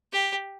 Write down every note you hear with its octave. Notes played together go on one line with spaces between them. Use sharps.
G4